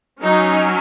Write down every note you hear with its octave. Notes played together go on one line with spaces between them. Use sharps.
F#3 C#4 D#4